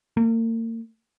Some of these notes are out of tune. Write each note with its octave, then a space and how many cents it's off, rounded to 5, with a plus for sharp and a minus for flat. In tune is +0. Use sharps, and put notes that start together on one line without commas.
A#3 -40